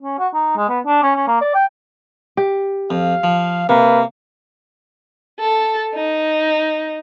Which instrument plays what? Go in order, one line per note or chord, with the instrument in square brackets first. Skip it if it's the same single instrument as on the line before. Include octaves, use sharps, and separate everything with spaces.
[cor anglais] C#4
F#4
D#4
G#3
B3
D4
C#4
C#4
A#3
D5
G5
[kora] G4
[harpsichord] F2 [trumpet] F5
[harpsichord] F3
[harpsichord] C3 [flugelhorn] A#3 [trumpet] B4
[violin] A4
D#4